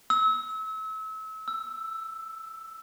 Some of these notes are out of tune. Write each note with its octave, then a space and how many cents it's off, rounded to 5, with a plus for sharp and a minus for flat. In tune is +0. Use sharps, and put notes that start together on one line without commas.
E6 -30
E6 +5